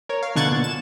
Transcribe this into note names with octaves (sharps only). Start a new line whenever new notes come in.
A#4 C#5
F5
B2 D3 C#6 F#6 G#6 A6
A#2
E7